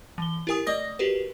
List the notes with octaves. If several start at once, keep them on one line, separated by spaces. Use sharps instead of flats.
E3 G7
E4 G4 A#4 G#5 D#6
A3 D5 D#5 D#6 A#6
F#4 G4 A#4 B4